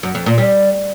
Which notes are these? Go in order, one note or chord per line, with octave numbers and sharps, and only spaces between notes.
F#2
F2
A#2
G3